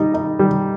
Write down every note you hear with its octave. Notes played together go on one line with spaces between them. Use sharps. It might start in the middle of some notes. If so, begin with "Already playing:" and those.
Already playing: G3 D#4
D#4
G3